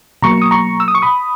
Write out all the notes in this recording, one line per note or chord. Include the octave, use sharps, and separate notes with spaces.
B2 F#3 A#3 A#5 C#6
D#6
A#5 C#6
E6
D#6
C#6
B5 D#6